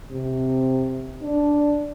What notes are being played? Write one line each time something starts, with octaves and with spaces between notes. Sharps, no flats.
C3
D4